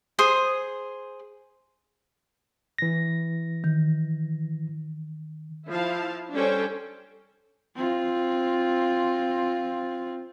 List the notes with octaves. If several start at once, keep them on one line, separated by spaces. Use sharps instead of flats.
G#4 C5 D#6
E3 A#6
D#3
F3 E4 F5 A5
G3 C#4 D4 A4 C5 G5
C4 F4